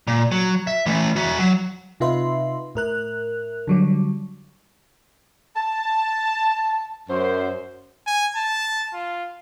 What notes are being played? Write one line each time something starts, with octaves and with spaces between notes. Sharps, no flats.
A#2
F#3
E5
E3 A3
F#4 E5
F#3
C3 D#4 F4 B4 E5 C6
A2 A#4 F#6
D3 F#3 G3
A5
F#2 C5
G#5
A5
F4